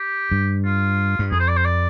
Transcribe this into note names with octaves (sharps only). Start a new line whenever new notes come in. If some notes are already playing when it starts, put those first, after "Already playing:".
Already playing: G4
G2
F4
G2
F2 G#4
C5
D5
C5
D5